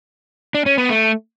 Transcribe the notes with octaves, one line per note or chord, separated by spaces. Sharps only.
D4
C#4
B3
A3